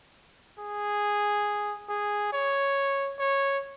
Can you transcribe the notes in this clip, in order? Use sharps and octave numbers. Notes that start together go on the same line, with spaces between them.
G#4
G#4
C#5
C#5